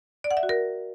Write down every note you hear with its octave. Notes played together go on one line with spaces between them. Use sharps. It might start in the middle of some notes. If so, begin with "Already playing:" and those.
D5
F#5
E5
F#4
A#4